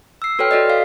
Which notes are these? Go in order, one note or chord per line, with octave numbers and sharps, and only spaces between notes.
E6 C7
F#4 A4 B4 C#5 G5 F6
F#4 A4 D5 D#5
F5 C7